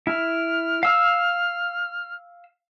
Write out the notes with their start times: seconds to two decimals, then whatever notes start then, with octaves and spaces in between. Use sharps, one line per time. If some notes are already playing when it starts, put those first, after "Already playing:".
0.07 E4 F6
0.83 F5 E6